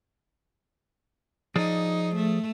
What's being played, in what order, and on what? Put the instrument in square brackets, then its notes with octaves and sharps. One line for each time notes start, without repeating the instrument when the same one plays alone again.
[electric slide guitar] F3 G#4 D5 [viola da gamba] D#4
[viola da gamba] A3